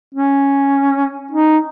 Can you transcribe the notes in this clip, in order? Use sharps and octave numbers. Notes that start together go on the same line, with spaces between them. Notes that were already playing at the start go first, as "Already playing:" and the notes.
C#4
D#4